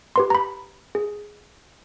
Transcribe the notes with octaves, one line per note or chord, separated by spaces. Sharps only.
G4 B4 C6
A#5 B5
G#4